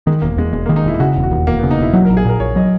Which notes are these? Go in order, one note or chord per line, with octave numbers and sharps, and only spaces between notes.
D#3 G#3
E1 A#3
E2 G#3
E1 G#3
A#3
D#3
D#4
E1 E4
E4
C#3 F#4
E1
F#4
D#2
E1 A#3
B3
C#3
D#4
E1 E4
F#3 F#4
A#4
A#1
G#4
A#2 A#4
A#1 C#5
F#3 D#5